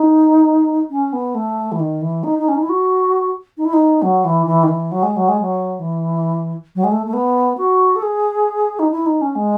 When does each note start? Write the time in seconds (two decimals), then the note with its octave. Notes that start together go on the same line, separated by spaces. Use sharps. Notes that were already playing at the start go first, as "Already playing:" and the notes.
Already playing: D#4
0.90 C#4
1.13 B3
1.35 A3
1.72 E3
1.79 D#3
2.02 E3
2.24 D#4
2.39 D#4
2.48 C#4
2.54 D#4
2.63 E4
2.69 F#4
3.57 D#4
3.65 E4
3.73 D#4
4.02 F#3
4.25 E3
4.46 E3
4.63 D#3
4.68 E3
4.92 F#3
5.03 G#3
5.16 F#3
5.28 G#3
5.41 F#3
5.79 E3
6.75 F#3
6.84 G#3
6.92 A3
7.06 A3
7.13 B3
7.58 F#4
7.96 A4
8.02 G#4
8.79 D#4
8.91 E4
9.06 D#4
9.21 C#4
9.35 G#3